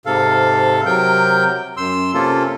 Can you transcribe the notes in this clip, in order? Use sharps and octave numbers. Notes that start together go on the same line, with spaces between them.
G#2 C3 A4 F5
C3 F#3 A#4 G5 G6
F#2 C6 E6
C3 A#3 C#4 F4 A4